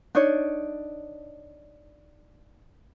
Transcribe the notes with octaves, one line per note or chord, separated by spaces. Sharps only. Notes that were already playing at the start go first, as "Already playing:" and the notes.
D4 D#4 C#5